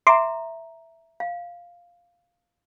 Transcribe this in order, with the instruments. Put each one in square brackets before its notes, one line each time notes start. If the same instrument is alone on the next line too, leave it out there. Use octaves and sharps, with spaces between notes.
[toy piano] E5 A#5 [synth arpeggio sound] C6 D6
[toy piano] F5